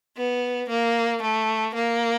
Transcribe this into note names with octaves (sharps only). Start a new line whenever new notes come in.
B3
A#3
A3
A#3